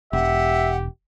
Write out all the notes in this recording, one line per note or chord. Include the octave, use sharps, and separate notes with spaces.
E1 G4 E5 F#5